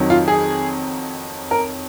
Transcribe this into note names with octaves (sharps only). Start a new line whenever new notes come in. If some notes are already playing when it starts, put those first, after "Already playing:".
Already playing: F2 D#3 F#3
F4
G#4
A#4